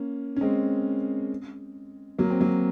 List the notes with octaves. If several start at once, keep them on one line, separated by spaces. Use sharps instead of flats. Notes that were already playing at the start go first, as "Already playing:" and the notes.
Already playing: A#3 C#4
C#4
G#3 C4
F#3 A#3
C4
F#3 A#3